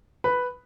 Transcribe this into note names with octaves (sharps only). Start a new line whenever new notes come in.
B4 B5